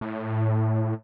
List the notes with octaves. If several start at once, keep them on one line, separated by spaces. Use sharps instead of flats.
A2